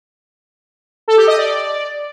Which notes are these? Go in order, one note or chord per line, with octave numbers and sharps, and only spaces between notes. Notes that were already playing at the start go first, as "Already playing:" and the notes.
A4
G4
D#5
D5